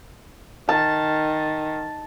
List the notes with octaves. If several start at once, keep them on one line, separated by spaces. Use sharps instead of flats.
D#3 A5